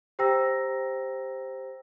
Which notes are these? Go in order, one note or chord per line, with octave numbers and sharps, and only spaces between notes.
G4 C5 G5 A#5 E6 A#6